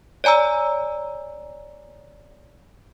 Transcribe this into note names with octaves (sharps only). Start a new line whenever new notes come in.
C#5 D5 G#5 A#5 E6